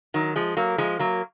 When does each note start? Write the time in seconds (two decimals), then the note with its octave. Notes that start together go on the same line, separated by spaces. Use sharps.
0.14 D#3 F#3
0.36 F3 G#3
0.57 F#3 A#3
0.78 F3 G#3
0.99 F#3 A#3